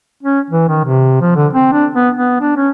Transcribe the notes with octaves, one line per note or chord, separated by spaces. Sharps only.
C#4
E3
D#3
C3
F3
D3
C4
D4
B3
B3
D4
C#4